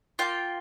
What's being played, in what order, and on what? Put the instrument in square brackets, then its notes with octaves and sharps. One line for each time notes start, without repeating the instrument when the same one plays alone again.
[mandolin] A#3 F4 G5